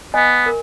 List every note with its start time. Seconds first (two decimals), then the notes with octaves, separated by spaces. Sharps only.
0.14 B3 D#5 G#5
0.46 A#4